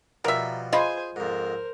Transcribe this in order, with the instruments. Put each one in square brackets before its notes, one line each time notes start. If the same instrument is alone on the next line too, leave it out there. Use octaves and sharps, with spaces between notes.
[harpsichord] B2 F3 G3 [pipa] A#4 E5
[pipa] F4 [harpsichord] G#4 [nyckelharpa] C5 G#5 [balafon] D#5 B5
[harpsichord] F2 G#2 [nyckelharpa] A#4 C5